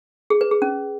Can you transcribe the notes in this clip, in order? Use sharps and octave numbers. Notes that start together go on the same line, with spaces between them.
G#4
B4
G#4
C#4